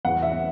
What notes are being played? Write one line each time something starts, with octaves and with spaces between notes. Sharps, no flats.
E2 F#5
E5